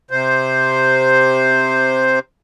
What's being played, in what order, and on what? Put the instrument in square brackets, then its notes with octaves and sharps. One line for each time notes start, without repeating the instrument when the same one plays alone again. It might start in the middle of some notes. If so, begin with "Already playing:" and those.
[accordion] C3 C5